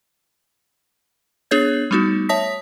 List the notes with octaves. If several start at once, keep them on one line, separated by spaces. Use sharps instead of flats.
B3 D4 G#4 C#5 G6 G#6
G3 A3 B3 D#4 F#4
C#5 E5 A5 D#6 A#6 B6